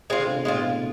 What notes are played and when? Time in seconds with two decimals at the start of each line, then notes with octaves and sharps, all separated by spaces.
0.10 G#3 C4 F4
0.19 D3
0.28 C3
0.37 B2
0.45 A2 G#3 C4 F4